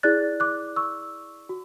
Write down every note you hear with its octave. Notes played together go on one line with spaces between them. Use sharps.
E4 G#4 D5 F#6 A6
D6 F#6
C#6 E6
F#4